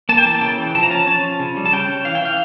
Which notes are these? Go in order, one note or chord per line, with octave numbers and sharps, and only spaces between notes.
A#3 A5
G5
E3 A5
C#3 G5
E3
F3 A5
A#5
C#4 A5
C#4 A5
F3
C#3
G3
A5
C#4 G5
C#4
E3 F5
G5
E3 F5